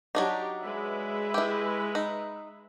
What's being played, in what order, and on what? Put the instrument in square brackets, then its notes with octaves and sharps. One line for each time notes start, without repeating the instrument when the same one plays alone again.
[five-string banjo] F#3 D4 D#4 [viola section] G4
[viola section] G#3 B4 E5
[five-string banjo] E4 G4
D#4